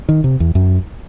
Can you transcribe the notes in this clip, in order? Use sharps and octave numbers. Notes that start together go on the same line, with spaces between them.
D#3
C3
E2
F#2